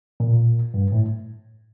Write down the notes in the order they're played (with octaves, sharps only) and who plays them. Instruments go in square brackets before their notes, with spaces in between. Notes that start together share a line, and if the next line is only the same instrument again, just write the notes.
[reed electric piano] A#2
G2
A2